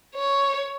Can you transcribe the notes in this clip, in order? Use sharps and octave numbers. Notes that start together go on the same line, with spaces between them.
C#5